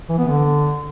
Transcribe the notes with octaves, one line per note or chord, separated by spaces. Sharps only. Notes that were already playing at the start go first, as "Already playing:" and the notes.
E3
B3
D3